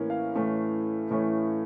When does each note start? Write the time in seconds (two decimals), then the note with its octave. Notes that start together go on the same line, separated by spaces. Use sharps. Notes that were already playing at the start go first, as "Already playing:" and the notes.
Already playing: A2 E3 A#3 C#4
0.10 F5
0.35 A2 E3 A3 C#4
1.10 A2 E3 A3 C#4